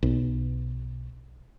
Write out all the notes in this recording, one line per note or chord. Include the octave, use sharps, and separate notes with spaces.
B1